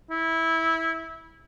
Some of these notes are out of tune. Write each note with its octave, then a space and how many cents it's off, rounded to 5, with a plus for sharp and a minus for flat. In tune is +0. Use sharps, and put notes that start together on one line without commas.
E4 -15